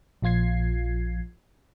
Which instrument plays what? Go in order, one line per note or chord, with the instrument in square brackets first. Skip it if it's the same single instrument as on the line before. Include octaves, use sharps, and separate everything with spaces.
[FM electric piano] A#1 F3 F4 G#6 C7